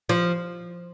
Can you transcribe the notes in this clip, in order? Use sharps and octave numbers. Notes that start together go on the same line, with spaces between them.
F3